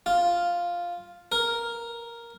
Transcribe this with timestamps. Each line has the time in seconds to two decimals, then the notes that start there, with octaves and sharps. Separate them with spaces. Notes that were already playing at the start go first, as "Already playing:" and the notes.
0.06 F4
1.32 A#4